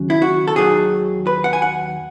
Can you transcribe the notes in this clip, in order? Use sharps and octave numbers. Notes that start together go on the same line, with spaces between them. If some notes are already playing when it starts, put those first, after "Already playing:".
Already playing: D#2 C#3 F#3
E4
F#4
A4
D#2 D#3 F#3 G#4
B4
F#5
G#5
F#5